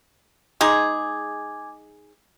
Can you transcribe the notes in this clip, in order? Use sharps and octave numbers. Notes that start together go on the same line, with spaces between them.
G#3 D#4 G#4 G#5 D6 G#6